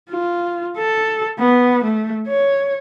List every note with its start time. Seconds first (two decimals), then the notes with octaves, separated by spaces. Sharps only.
0.11 F4
0.78 A4
1.39 B3
1.84 A3
2.28 C#5